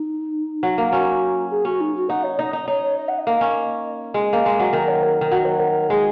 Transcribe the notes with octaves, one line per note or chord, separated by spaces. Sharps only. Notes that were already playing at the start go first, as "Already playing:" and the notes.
Already playing: D#4
F#3
A#3
C#4 F#4
G#4
C#4 F#4
D#4
F#4
D#4 F#5
C#5
D#4 D#5
D#4
D#4 C#5
C#5
D#5
F#5
D#5
A#3
C#4
G#3 D#5
A#3
G#3
F#3
D#3 D#5
C#5
A#4
D#3
F#3 A#4
C#5
A#4
G#3 G#4